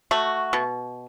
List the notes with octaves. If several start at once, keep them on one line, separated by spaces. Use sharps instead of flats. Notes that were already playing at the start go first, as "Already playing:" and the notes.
A3 F#4
B2